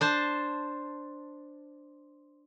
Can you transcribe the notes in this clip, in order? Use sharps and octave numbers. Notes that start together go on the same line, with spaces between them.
D4 C5 A5